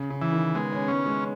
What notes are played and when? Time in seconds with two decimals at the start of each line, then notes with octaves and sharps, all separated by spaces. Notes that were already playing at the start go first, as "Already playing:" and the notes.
Already playing: C#3
0.10 C#3
0.22 E3
0.32 D#3
0.55 G#3 B3
0.72 C#4
0.88 B3 C#4
1.06 G#3